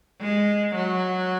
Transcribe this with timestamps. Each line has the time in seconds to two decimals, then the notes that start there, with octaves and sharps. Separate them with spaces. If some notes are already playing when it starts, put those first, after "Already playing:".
0.21 G#3
0.75 F#3